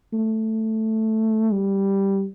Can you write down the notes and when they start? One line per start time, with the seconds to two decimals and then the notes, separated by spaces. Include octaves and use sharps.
0.13 A3
1.53 G3